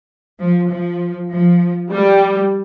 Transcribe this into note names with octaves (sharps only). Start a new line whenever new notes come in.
F3
F3
F3
G3